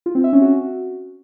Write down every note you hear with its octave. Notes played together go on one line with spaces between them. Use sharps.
F4
C4
E5
C#4
F#4